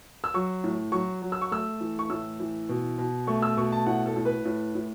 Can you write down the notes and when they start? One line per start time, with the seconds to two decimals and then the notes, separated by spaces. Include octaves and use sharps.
0.24 E6
0.34 F#3 C#6
0.64 A2
0.92 F#3 C#6
1.22 F#3
1.32 E6
1.41 C#6
1.51 A3 E6
1.80 E3
1.99 C#6
2.10 A2 E6
2.40 E3
2.69 B2
2.98 B2
3.27 A3 C#6
3.42 E6
3.57 B2 C#6
3.72 A5
3.86 A2 F#5
4.06 A4
4.16 A2
4.25 B4
4.45 A2
4.75 A2